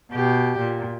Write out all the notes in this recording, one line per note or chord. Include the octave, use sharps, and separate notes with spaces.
B2 G4
A#2